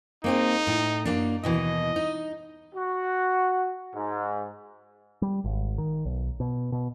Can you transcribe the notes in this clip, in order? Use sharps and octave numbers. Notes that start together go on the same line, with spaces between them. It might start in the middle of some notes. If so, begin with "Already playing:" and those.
A#3 C4 D#4 G#4
A2
F#2 A#3 D4
D#2 B2 E3 D#5
D#4
F#4
G#2
G3
G#1
D#3
B1
B2
B2